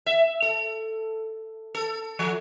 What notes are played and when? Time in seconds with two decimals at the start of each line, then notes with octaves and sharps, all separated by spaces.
0.06 E5
0.42 A4
1.75 A4
2.19 F3